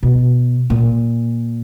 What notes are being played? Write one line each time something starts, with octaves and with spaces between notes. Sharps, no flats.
B2
A#2